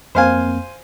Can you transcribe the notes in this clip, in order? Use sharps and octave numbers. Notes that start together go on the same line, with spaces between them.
F2 A#3 C4 C5 F5 G#5